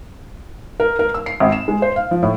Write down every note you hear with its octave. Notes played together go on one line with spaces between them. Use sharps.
A#4
A#4
E6
C7
G#1
E7
G#3
C5
F5
F3
A2